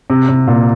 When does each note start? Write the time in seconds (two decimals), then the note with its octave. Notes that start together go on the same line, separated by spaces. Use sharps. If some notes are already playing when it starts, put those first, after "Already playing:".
0.10 C3
0.29 C3
0.47 A#2